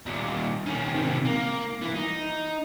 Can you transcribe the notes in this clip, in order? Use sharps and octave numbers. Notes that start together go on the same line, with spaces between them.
D#2 A#2
D#3 C#4
C3 D#3
A#3
E3 E4
D#4